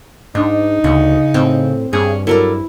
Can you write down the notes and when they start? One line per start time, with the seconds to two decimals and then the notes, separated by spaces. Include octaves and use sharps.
0.35 G#2 D4 D#4
0.84 D2 C#3
1.34 A2 C4
1.93 G2 C#4 G#4
2.27 F#3 E4 A4 A#4 D5